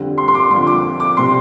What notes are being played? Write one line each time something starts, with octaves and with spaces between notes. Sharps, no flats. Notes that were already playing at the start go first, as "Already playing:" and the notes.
Already playing: F2 D3 G3
C6
C6
D6
F2 D3 F3 C6
D6
D6
C3 G3 C6